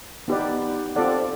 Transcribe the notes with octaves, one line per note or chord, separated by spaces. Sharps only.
B3 D#4 G4 B4 D5
C4 F4 A4 D5 F#5